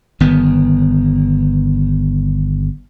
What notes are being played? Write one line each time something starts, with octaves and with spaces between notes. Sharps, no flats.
G1 D#3 B3